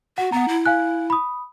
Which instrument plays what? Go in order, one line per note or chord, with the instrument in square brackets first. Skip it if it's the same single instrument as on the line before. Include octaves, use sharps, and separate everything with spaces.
[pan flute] F#4 [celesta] F#5
[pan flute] B3 [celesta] F#5 A#5
[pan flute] E4
[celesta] F5 G#5 F#6
B5 D#6